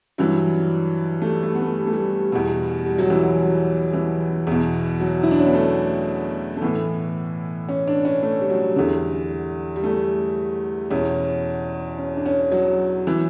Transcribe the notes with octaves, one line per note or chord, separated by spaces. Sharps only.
G2 E3 F#3
A3
G3
A3
B3
A3
G3
A3
G3
E2 B2
G3
F#3
E3
F#3
E3
E2 B2
F#3
E4
D4
C#4
B3
A3
A3
A2 E3 B3
C#4
D4
C#4
A3
G3
F#3
E2 D3 G3
G3
A3
E2 B2 C#4
C#4
D4
C#4
F#3
E3